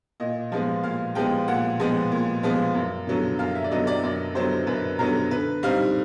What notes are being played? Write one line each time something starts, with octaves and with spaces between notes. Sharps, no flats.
A#2 D#5
F3 G#3 B3
A#2 F5
F3 G#3 B3 G5
A#2 F#5
F3 G#3 B3
A#2
F3 G#3 B3
F#2
D3 F#3 B3
F#2 F5
E5
D5
D3 F#3 B3 D#5
D5
F#2 D5
D3 F#3 B3 C5
F#2 B4
D3 F#3 B3 A#4
D3 B4
G3 C4 D#4 F5